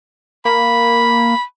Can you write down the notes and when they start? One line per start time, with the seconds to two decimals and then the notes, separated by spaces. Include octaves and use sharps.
0.45 A#3 B5